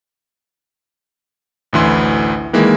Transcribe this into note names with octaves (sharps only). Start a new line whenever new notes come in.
A1 D2 E3 C6
D#3 E3 G#3 A#3